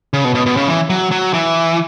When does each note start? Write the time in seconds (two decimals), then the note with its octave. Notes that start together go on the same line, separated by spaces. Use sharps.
0.13 C#3
0.24 B2
0.35 B2
0.46 B2
0.57 C#3
0.68 E3
0.90 F#3
1.11 F#3
1.33 E3